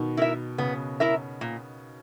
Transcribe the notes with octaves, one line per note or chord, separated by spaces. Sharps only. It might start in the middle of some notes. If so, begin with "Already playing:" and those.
Already playing: B2 D#3
E4 A#4 E5
C#3 B3
E4 A#4 E5
A#2